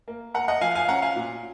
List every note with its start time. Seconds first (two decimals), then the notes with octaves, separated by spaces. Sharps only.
0.08 A#3
0.34 A#3 F#5 A#5
0.48 D#5 F#5
0.61 F3 F5 G#5
0.75 F5 G#5
0.88 C#4 F#5 A#5
1.02 F5 G#5
1.16 A#2